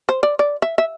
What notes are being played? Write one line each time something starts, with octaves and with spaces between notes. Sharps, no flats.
C5
D5
D5
E5
E5